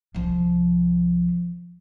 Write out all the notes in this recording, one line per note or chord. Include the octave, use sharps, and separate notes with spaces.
C2 F3